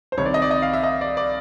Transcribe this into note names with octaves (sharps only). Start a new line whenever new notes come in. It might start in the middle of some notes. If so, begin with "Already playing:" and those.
C5
C2 C3 D#3 C#5
D5
D#5
D5
D#5
F5
E5
D#5
D5
D5